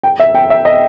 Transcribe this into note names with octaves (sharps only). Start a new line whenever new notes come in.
G5
E5
G5
E5
D#5